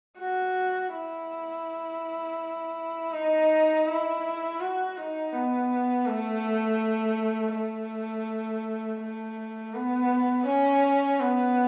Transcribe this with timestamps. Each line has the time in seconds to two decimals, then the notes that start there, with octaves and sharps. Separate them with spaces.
0.19 F#4
0.93 E4
3.12 D#4
3.86 E4
4.60 F#4
4.97 D#4
5.33 B3
6.06 A3
7.53 A3
9.00 A3
9.74 B3
10.47 C#4
11.20 B3